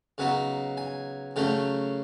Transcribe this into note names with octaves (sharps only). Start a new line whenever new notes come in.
C#3 F#3 B3 D#4
G#5
C#3 F#3 A3 C#4 G5